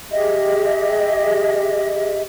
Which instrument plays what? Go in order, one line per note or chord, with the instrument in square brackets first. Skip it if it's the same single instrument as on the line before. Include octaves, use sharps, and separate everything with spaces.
[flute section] G4 G#4 D#5 E5